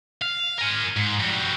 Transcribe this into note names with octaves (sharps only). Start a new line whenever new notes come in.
F5
A#4 G#5
G#2
G3 F#4